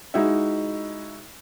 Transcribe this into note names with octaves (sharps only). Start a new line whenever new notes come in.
G#3 D#4 E4 F#4 E5